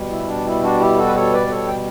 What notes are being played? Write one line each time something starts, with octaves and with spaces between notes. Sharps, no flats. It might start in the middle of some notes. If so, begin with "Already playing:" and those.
Already playing: B2 G3
E4
D4
E4
D4 F#4
E4 G4
F#4 A4
B4
A4 C#5
B4 D5
B4
A4 C#5
G5